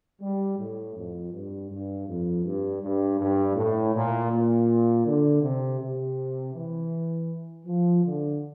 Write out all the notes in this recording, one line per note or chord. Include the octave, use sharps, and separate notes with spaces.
G3
A2
F2
G2
G2
F2
G2
G2
G2
A2
A#2
A#2
D3
C3
C3
E3
F3
D3